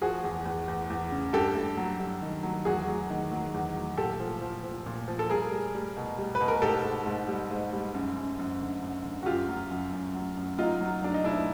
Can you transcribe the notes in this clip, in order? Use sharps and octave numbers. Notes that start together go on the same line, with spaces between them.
F3 F#4 G#4
E2
E2
E2
E2
C#3
G2 G4 A4
G2
F#3
G2
D#3
F#3
E2 F#4 G#4
F#3
D#3
F#3
E2
F#3
A#2 G4 A4
F3
F3
F3
A#2
F3
A4
G3 G#4 A#4
G3
G3
B2
G3
B4
B2
A#4
G#2 G4 A4
G#2
G#2
G3
G#2
G3
F#2
F#2
F#2
D3
F#2
D3
F#4
F#2 F4 G4
F#3
F#2
F#2
F#3
F#2
F#3 D#4 F4
F#3
F#3 D4
D#4
B2 D4 E4